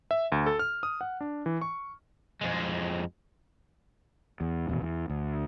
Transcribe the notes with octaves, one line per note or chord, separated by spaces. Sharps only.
E5
D2
A4
F6
D#6
F#5
D4
E3
C#6
F2 G#3
E2
D#1 E2 B2
E2
D2